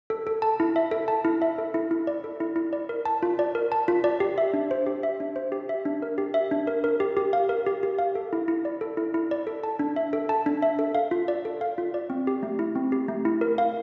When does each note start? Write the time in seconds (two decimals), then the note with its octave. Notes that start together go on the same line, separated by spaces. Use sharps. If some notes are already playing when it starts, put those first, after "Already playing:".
0.10 A4
0.27 A4
0.42 A5
0.60 E4
0.76 E5
0.91 A4
1.08 A5
1.25 E4
1.42 E5
1.58 A4
1.74 E4
1.91 E4
2.07 D5
2.24 A4
2.40 E4
2.56 E4
2.73 D5
2.89 A#4
3.05 A5
3.23 F4
3.39 D5
3.55 A#4
3.72 A5
3.88 F4
4.04 D5
4.20 G4
4.38 E5
4.54 D4
4.71 C5
4.86 G4
5.03 E5
5.20 D4
5.36 C5
5.52 G4
5.69 E5
5.85 D4
6.02 A#4
6.18 G4
6.34 E5
6.51 D4
6.67 A#4
6.84 A#4
7.00 G4
7.17 G4
7.33 F5
7.49 A#4
7.66 G4
7.83 G4
7.99 F5
8.15 A4
8.33 E4
8.48 E4
8.65 D5
8.81 A4
8.97 E4
9.14 E4
9.31 D5
9.47 A4
9.64 A5
9.79 D4
9.96 E5
10.13 A4
10.29 A5
10.46 D4
10.62 E5
10.79 A4
10.95 F5
11.11 F4
11.28 D5
11.45 A4
11.61 F5
11.78 F4
11.94 D5
12.10 C4
12.27 G4
12.43 A3
12.59 E4
12.75 C4
12.92 G4
13.08 A3
13.25 E4
13.41 A#4
13.58 F5